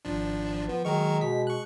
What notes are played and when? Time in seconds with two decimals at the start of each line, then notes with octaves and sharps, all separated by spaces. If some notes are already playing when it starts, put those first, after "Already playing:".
0.05 G#1 F3 D4
0.69 F3 B3
0.85 D#3 F#3 G#3 A#4 C#6
1.21 B2 B6
1.47 C#6 F#6